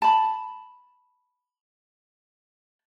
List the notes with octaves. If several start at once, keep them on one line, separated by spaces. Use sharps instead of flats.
A5 B5